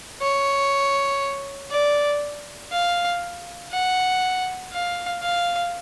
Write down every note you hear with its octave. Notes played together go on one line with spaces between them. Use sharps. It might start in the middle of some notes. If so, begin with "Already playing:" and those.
C#5
D5
F5
F#5
F5
F5